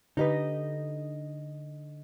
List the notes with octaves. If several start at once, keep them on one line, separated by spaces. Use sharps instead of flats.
D3 D#4 G4 B4 D#5